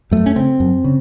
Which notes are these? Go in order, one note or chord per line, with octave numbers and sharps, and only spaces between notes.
F#2 A3
C#4
C#3 C4
F#2
C#3